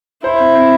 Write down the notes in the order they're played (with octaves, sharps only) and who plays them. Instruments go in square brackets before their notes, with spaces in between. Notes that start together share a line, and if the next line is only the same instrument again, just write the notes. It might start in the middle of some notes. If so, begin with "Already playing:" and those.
[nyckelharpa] E4 [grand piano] C5
[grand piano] C4
C4